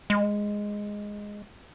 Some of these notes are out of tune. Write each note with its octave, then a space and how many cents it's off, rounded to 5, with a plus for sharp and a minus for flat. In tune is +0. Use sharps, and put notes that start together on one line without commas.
G#3 -5